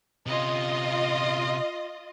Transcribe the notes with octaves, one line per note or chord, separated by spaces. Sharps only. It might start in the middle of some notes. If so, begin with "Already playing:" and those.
C3 C#4 F4 D#5